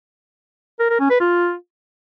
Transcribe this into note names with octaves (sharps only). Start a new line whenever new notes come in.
A#4
A#4
C#4
B4
F4